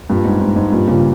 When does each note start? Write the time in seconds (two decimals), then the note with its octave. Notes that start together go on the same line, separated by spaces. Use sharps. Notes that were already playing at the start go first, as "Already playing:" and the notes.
0.09 G2 A#2
0.25 G#2
0.41 G#2
0.56 G#2
0.72 G2 A#2
0.87 A#2 C#3